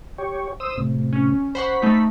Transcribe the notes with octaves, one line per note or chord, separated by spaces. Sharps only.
G4 C#5
C5 D#6 E6
A2 C3
C#4
C5 F#5 B5 C#6
A3 D#4